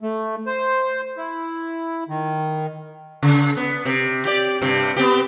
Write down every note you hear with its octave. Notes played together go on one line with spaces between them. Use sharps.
A3
C5
E4
D#3
C#3
B3
C3
G4 D5
G2 C3
B3 C4 G4